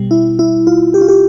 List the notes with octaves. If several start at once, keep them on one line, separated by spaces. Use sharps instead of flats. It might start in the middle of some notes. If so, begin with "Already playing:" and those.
Already playing: B2 G3
E4
E4
F4
G4
F4
G4